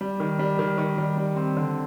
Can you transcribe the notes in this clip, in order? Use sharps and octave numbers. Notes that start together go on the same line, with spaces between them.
G3
D#3
G3
D#3
D#3
G3
G3
C4
D3